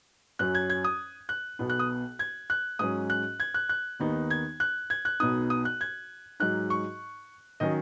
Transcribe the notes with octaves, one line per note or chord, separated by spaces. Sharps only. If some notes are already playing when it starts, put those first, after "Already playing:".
F#2 F#3 C#4 F#6
G#6
G#6
D#6
F#6
B1 B2 B3
F#6
D#6
G#6
F#6
G#2 F#3 C#4 D#6
F#6
G#6
F#6
F#6
D#2 D#3 B3 D#4
G#6
F#6
G#6
F#6
B1 B2 B3 D#4 D#6
D#6
F#6
G#6
G#2 F#3 D#4 F#6
C#6
D#3 F#3 C#4 D#5